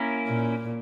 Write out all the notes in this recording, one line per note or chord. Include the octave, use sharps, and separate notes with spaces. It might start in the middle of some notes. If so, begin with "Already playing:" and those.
Already playing: A#3 C#4 E4 A#4
A#2